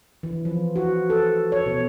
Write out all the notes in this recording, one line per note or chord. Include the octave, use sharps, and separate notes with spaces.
E3
F3
F#4
A4
C#5
B2